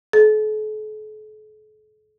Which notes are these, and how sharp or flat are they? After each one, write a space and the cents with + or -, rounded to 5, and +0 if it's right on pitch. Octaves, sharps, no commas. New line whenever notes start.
A4 -45